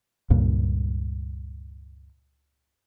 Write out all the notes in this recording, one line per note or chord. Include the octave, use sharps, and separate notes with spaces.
C#2 G2 A#2